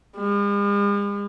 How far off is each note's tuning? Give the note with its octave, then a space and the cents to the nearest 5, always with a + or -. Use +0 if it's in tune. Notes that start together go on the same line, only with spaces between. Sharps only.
G#3 -45